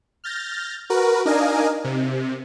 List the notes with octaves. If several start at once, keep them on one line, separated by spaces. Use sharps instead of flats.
F6 G6 A6 A#6
F#4 A#4 B4
D4 D#4 A#4 D#5 F5 G#5
C3